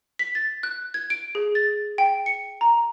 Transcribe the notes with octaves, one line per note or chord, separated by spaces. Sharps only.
B6
A6
F#6
G#6
D7
G#4
A6
G5
C#7
A#5